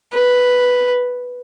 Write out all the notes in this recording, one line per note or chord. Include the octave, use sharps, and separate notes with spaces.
B4